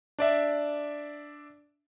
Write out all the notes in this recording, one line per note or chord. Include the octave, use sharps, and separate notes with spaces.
D4 D5 E5